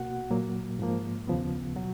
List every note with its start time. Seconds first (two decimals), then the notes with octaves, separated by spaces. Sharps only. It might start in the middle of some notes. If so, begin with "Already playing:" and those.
Already playing: B2 A#3 F#4 F#5
0.30 A#2 F#3 A#3
0.79 G#2 F3 A#3
1.28 D#2 C#3 F3 B3
1.76 B2 F#3 F#4